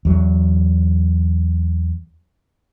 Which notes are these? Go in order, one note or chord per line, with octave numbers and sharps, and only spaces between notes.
E2 F#3